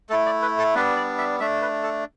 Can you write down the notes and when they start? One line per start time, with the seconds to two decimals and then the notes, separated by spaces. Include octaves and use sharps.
0.10 A3 A4
0.13 E4
0.26 D5
0.42 B4
0.59 A4
0.75 G3 B3 D4 B4
0.96 D5
1.18 E5
1.40 A3 D4 E5
1.62 B4
1.83 A4